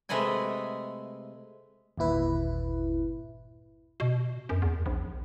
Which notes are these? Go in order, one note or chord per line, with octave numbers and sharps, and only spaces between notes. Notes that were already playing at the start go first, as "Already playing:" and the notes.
C3 G#3 A3 B4 D#5 G#5
G1 D#2 A#2 E4 B4
B2
F#2
E2
A#1